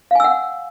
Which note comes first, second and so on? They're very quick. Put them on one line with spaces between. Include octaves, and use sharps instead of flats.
F5 G#5 E6 F#5